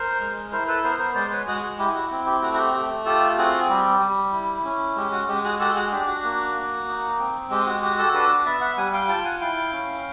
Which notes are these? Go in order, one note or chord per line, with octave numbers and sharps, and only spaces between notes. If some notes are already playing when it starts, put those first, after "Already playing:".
Already playing: A#4 C5
G#3
E4 A#4 C5
A4 B4
B3 A#4 C5
A#4 C5
G#3 C5 D5
B4 C#5
G#3 F#4 G#4
F#4
E4 G4
F#4
C4
G4
A3 F#4
F#4
G4
A3 G4
F4 G4 A4
C4 F#4 G#4
G#4
G3 G4
G3
E4
C#4
G#3 G4
F#4
G#3 G4
F#4 G#4
F#4 G4 A4
F#4 G#4
D4 G4
F#4
A#3
A#3
D#4
C4
G#3 G4
F#4
F#4 G4
G4 A4
D4 A4 B4
B3 D5 E5
E5 F#5
G3 F#5 G#5
F5 G5
F4 G5 A5
F#5 G#5
E4 F5 G5
C#4